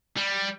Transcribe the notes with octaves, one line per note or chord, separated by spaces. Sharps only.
G3